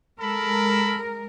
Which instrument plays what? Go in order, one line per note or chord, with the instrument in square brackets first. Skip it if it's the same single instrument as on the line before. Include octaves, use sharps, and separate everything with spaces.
[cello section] G#3 A#4 [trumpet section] A4 B5